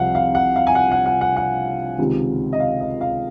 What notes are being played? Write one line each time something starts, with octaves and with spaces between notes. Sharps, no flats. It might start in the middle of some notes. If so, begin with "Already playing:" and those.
Already playing: C2 C3 F3 F5 F#5
F5
F#5
F5
G#5
F#5
F#5
F#5
F#5
F#5
C#2 C3 D#3
D#5
F5
D#5
F5